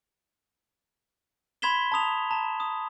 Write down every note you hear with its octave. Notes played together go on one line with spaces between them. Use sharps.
B5 C6 G#6 B6 E7 G7
A5 A#5 D#6 F7
A5 A#5
D#6